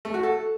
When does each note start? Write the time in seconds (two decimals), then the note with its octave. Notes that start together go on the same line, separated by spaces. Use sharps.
0.05 A3
0.14 F#4
0.23 A4